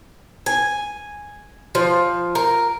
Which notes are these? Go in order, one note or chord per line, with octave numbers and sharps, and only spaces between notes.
G#5
F3
A#4